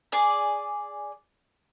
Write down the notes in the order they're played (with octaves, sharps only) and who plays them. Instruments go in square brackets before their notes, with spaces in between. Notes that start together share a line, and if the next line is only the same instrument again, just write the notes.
[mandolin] G#4 D5